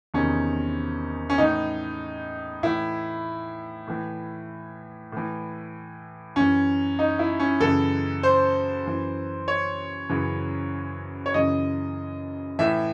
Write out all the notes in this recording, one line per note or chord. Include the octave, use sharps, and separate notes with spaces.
E2 C3 D#3 C#4
C#4
A2 E3 D#4
A2 E3 E4
A2 E3
A2 E3
F#2 E3 C#4
D#4
E4
C#4
F#2 C#3 E3 A4
C5
F#2 E3
C#5
F#2 C#3 E3
C#5
F#2 C#3 E3 D#5
A2 E3 E5